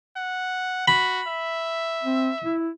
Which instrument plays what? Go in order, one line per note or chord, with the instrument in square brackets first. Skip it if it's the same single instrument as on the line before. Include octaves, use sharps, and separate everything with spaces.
[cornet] F#5
[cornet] F#4 [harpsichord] B5
[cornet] E5
[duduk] C4
E4